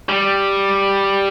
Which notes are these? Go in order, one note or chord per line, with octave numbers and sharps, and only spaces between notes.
G3